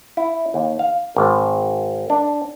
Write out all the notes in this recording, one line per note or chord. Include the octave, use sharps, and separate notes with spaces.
E4
D#2
F5
G#1
D4